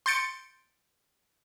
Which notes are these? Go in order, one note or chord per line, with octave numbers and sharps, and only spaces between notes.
C6 G6 A6 C#7 D7